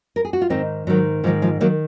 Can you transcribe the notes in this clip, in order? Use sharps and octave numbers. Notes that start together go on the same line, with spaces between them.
A#4
G#4
F#4
F4
G#2 D#3 C4 D#4
G#2 D#3 F#3
G#2 D#3 F3
F3 G#3
D#3 F#3 A#3